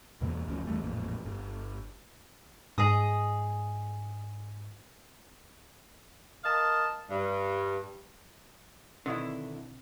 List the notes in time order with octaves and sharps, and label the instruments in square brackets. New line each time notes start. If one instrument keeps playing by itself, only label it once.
[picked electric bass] E2 B2 E3 A#3
F#1 D2 F3 C#4
E2 E3 G3 A3
A1 F2 A#2
G1
[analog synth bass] G#2 [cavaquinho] G#4 D#5 D#6
[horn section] A#4 D#5 F5 A5
G2
[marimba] B2 C4 D#6 [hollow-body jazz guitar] D3 D#3 E4